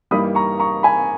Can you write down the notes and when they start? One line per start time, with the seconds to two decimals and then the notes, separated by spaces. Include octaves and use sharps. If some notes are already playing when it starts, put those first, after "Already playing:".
0.11 G2 E3 G3 A#3 D#4 B5 D#6
0.35 A#5 C#6
0.60 A#5 C#6
0.83 G#5 B5